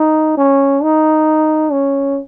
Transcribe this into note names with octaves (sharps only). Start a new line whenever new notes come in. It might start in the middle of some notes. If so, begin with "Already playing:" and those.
Already playing: D#4
C#4
D#4
C#4